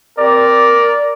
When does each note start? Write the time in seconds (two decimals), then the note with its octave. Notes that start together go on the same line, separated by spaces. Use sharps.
0.18 C4 G4 A#4 D5